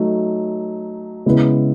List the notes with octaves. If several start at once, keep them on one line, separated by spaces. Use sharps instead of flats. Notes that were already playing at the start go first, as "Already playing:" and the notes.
Already playing: F#3 A3 D#4
C#3 G#3 B3 E4 B4